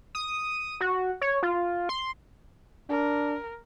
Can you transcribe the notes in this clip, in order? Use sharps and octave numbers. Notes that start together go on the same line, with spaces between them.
D#6
F#4
C#5
F4
C6
D4 A#4